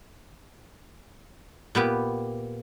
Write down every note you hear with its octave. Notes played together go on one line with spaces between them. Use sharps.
A#2 B3 G4